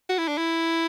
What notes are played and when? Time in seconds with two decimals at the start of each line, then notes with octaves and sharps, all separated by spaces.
0.09 F#4
0.18 E4
0.28 D4
0.38 E4